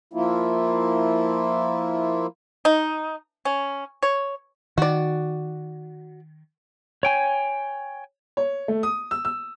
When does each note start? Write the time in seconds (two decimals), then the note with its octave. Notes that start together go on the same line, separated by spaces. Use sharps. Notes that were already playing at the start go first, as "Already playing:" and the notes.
0.13 F3 A#3 E4 F4
2.65 D#4
3.45 C#4
4.03 C#5
4.78 D#3 F#4 D5
7.03 C#5 G5 G#5
8.37 C#5
8.68 A3
8.83 D#6
9.11 E6
9.25 E6